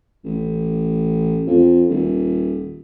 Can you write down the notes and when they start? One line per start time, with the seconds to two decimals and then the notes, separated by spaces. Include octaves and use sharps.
0.25 A1
1.47 F2
1.89 D#1